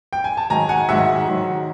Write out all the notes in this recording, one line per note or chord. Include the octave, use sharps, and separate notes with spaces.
G5
G#5
A5
G#2 D#3 F#3 G#5 A#5
F#5 G#5
G#2 D#3 F#3 E5 F#5
G#2 D#3 F#3